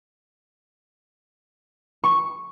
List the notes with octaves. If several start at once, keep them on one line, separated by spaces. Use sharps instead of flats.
C#6